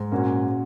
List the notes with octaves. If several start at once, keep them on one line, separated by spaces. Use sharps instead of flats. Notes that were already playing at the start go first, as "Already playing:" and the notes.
Already playing: G#2
A#2 A#3 C#4 F#4 A#4